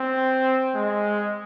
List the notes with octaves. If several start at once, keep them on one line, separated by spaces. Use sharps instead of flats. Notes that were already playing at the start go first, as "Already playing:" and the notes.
Already playing: C4
G#3